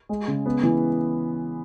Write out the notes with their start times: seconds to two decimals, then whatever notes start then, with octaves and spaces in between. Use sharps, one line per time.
0.09 G#3
0.28 C#3
0.46 B3
0.63 E3